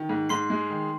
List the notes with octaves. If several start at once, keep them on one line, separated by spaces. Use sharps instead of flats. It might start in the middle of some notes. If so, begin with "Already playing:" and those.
Already playing: D#3
G#2
G#2 C6 C7
G#3
D#3